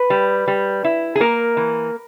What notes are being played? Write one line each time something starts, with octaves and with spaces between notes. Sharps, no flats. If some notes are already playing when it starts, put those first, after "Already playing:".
Already playing: B4
G3
G3
E4
G#4
A#3 A#4
E3